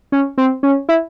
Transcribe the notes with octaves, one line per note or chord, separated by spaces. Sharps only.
C#4
C4
C#4
E4